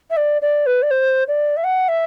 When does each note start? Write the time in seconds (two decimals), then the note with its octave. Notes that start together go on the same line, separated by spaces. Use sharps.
0.10 E5
0.17 D5
0.42 D5
0.66 B4
0.82 D5
0.91 C5
1.28 D5
1.57 E5
1.64 F#5
1.88 E5